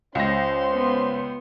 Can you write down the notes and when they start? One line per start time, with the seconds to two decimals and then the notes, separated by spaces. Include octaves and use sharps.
0.15 C#2 C#4 C5 C#5 C6 A#6
0.72 B3